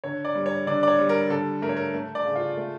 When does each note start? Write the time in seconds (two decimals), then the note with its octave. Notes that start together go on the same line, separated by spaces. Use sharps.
0.04 D3 C#5
0.25 D5
0.35 G3
0.46 C#5
0.67 D3 D5
0.83 D5
0.88 C#5
0.99 G3
1.09 A#4
1.30 D3 A4
1.62 A3 A#4
1.69 C#5
1.77 A#4
1.94 A3
2.15 D5
2.25 C#3
2.35 F4
2.57 A3